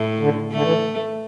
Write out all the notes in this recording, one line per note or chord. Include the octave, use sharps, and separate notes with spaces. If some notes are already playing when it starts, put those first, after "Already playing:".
Already playing: A2
D3
D3 A3
E3